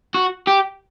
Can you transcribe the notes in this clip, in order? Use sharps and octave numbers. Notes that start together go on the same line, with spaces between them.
F#4
G4